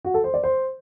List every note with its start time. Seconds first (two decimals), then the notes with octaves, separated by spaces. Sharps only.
0.05 F#4
0.14 A4
0.24 C5
0.34 D5
0.43 C5